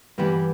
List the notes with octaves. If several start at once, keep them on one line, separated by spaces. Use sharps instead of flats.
G2 E3 G3 B3